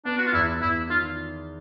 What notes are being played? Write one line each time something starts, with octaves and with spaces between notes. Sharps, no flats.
B3 D4
F#4
F4
E2 E4
E2 E4
D#3 F4